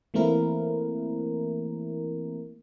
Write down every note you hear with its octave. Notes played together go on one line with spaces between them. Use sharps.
E3 A3 A#3 C4 E4 A#4